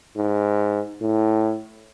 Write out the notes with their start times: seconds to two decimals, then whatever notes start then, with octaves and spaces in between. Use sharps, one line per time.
0.16 G#2
1.01 A2